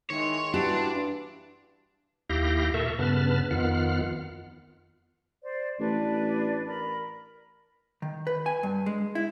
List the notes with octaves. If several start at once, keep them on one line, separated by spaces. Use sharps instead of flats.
D#3 E3 G#3 C#5 C6
G2 E3 D4 E4 F#4 G4
D#2 E4 G4 F5 G6 A#6
A#2 A4 A#4 E5 C#6
G2 C#3 B3 B4 A5 F6
F2 D#3 B3 F4 F#5 F6
C5 D5
A1 D4 B4 D5
A#4 B5
D#3
B4
G#5
G2
G#3
E4